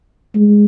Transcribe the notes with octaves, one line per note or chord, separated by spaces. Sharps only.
G#3